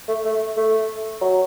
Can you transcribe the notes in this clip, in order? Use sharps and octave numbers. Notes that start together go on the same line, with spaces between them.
A3
A3
A3
F#3